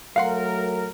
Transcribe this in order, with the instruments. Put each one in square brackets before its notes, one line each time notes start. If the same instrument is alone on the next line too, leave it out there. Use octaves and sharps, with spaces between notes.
[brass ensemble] F#3 A3 A#4 [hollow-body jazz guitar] F5 F#5 C6